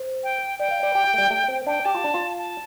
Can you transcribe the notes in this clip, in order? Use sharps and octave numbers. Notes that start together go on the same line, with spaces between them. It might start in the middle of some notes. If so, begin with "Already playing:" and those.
Already playing: C5
G5
D5 G5
F5
D5
G4
A3
G3
A3
C4
D4 G5
G4 A5
F4
D4
F4
A5